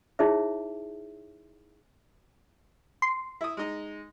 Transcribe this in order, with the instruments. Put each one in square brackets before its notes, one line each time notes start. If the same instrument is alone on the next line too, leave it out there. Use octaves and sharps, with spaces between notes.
[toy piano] D#4 E4 G#4 C#5 E5
[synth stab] C6
[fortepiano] E4 D#6
G#3 D#4